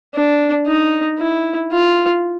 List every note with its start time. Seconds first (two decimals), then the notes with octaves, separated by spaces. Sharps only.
0.15 D4
0.67 D#4
1.19 E4
1.71 F4